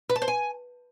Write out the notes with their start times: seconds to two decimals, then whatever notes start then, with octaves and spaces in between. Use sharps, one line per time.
0.10 B4
0.16 A5
0.22 C5
0.28 G#5